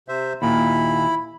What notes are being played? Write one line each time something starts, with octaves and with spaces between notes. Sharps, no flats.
C3 C5 E5
D#2 A#2 E4 B5